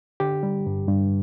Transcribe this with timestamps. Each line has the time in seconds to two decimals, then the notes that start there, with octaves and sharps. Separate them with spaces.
0.20 D3 G4
0.43 G3
0.67 G2
0.88 G2